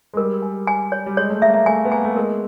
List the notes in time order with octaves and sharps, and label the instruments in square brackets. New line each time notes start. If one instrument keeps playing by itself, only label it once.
[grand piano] G#3
[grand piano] G3 [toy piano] A#4
[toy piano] G#5
G#5
C#5
[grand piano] G3
[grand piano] G#3 [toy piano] C#5
[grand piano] A3
[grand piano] A#3 [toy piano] E5
[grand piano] A#3
[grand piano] A3 [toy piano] G#5
[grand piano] B3
[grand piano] A#3 [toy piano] G#5
[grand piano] A3
[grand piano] G#3 [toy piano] A#4